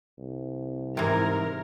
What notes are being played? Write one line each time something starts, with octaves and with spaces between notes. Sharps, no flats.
C2
G#2 C3 E3 A#4